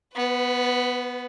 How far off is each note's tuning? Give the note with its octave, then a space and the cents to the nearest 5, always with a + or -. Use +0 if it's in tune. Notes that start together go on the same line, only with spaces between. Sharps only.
B3 +0 B4 +35